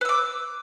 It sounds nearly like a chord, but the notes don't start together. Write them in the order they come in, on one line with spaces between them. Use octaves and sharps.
B4 E6 D6